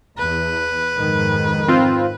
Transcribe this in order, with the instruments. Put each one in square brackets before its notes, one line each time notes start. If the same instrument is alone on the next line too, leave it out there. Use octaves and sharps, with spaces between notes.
[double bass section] E2 [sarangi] B4
[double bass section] F2 G#2 D#3
[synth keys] C4 F4